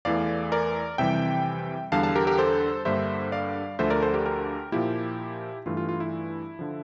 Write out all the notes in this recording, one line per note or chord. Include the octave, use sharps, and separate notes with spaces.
E2 E3 A3 D5 F5
A#4 D5
F2 C3 E3 G3 E5 G5
E2 D3 G3 F5 A5
F5 A5
G4 A#4
G4 A#4
A4 C5
G2 D3 G3 A#3 C5 E5
D5 F5
D2 D3 F3 A3 C5 E5
A#4 D5
A4 C5
G4 A#4
G4 A#4
A#2 F3 A#3 E4 G4
G2 E3 A3 F4
F4
F4
E4
D3 F3